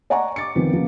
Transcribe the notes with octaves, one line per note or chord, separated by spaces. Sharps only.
D5 D#5 F#5 G#5 A#5 C#6
D6 A6 C#7
D#3 F3 B3 C4 B4
C#3 F3 A#3 B3